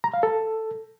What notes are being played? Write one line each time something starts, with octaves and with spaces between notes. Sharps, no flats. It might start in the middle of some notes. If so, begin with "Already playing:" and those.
A#5
F5
A4